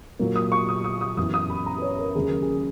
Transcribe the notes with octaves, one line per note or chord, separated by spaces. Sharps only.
A#2 F#3 A#3
D#6
C#6
D#6
D#6
D#6
F#2 E3 B3 E4 D#6
D#6
B5
A#5
B4
C#5
A#4
D#2 C#3 F#3 G#4
A#4
G#4